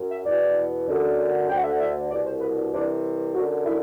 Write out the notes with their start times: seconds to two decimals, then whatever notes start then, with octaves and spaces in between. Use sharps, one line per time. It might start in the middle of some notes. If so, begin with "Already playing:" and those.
Already playing: F#2
0.09 E5
0.25 E2 B2 D5
0.87 F#2 D3
1.49 D2 D3 G5
1.56 F#5
1.63 E5
1.71 F#5
1.80 E5
2.10 C2 B2 D5
2.26 C5
2.42 B4
2.57 D4
2.72 C2 C3 E3 D4
3.34 F#2 D3 F#4
3.65 E4